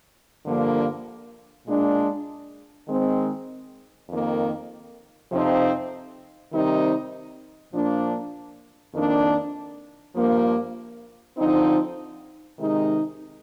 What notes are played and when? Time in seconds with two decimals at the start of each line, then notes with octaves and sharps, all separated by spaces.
0.44 G2 D3 F3 A#3
1.65 A#2 G#3 D4
2.86 D#3 G#3 C4
4.08 F2 D#3 A#3
5.30 F2 C3 F3 C4 D#4
6.51 C3 D#3 G3 C4 D#4
7.72 A#2 F3 A#3 D4
8.93 F2 D#3 A#3 D4
10.14 G2 F3 A#3
11.36 D3 F3 C4 D#4
12.57 C3 D#3 G#3 D#4